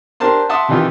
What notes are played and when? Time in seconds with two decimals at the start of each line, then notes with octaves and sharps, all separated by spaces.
0.20 D4 G4 A#4 C5 A5 C6
0.49 E5 F#5 A5 C6 D6 D#6
0.68 C3 D#3 E3 D#4 F4 G4